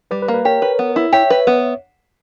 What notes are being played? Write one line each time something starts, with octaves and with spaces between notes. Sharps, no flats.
G3 B4
B4
A#3
B4
G4 A#4 C#5
B4
B3
E4
G4 C#5 E5
B4
B3